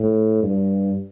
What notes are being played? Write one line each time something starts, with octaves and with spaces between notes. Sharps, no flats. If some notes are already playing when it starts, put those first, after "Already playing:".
Already playing: A2
G2